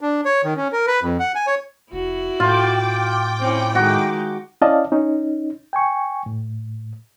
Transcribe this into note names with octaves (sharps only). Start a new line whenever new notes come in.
D4
C#5
D#3
C#4
A#4
B4
F2
F#5
G#5
C#5
F1 E4 F#4
A2 F4 G5 D6
C4 C#4 E4
D#3 G#3 F#4
C#4 E4 D5 D#5 F5 A5
C#4 D#4
G5 G#5 C#6
A2